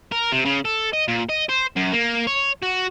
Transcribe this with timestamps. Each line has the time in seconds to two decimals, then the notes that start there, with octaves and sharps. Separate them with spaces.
0.12 A#4
0.32 C3
0.45 C#3
0.65 A4
0.93 D#5
1.08 A#2
1.29 D#5
1.49 C5
1.76 F#2
1.92 A#3
2.27 C#5
2.63 F#4